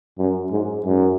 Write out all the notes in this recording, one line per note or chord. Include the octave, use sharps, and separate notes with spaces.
F#2
G#2
F#2